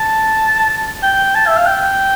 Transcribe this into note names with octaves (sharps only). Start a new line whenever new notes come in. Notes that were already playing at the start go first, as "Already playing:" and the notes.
Already playing: A5
G5
A5
E5
F5
G5